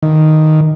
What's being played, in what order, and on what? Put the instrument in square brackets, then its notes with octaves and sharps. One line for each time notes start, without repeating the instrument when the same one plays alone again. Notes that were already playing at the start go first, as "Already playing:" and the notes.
[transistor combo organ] D#3